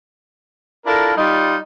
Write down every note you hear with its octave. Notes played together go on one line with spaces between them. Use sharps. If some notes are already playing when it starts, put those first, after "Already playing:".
D4 E4 F4 A4 A#4
G3 D#4 F4